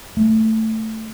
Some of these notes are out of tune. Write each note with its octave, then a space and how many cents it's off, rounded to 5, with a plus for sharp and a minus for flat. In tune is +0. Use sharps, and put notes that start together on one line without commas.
A3 +10